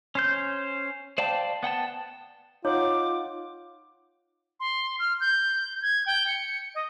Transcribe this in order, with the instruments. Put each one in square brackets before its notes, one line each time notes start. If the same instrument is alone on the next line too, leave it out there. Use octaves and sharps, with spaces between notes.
[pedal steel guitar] C#4 C5 G6
C5 D5 F5 G5 A5
B3 F#5 G5 A5
[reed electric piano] D#4 F#5 [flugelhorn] F4 [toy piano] C#5 [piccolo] D6
[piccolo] C6
F6
G6
G#6
G5
C#7
D#5